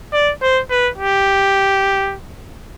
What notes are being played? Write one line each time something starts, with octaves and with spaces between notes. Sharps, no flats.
D5
C5
B4
G4